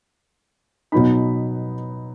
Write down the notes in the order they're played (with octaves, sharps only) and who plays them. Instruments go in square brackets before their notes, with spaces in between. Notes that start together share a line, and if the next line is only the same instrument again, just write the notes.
[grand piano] B2 F#3 B3 D#4 B5